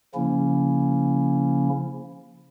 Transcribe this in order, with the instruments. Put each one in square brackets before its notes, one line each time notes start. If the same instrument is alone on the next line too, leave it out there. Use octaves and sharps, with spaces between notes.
[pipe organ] C#3 F3 A#3 C#4 E4